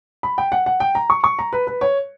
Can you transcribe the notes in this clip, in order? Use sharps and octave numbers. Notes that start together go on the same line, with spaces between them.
B5
G5
F#5
F#5
G5
A#5
C#6
C#6
A#5
B4
B4
C#5